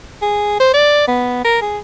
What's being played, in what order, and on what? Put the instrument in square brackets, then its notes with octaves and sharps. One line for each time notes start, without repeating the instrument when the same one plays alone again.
[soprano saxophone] G#4
C5
D5
B3
A#4
G#4